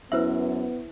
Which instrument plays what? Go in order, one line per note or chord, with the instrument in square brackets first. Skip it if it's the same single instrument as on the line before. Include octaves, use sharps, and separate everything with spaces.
[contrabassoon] F#2 [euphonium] B3 [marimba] E4 [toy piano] B4 C5 E5